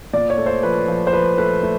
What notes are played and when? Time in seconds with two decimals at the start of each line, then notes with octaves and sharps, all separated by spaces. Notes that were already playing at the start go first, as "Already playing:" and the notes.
0.13 A#2 D5
0.30 C#5
0.38 A3
0.46 C5
0.63 F3 B4
0.88 F3
1.07 C5
1.13 F3 B4
1.38 A3 B4
1.63 A3